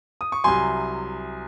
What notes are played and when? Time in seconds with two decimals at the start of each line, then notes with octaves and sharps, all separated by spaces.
0.21 D#6
0.32 C#6
0.44 C2 C3 F#3 G#5 C6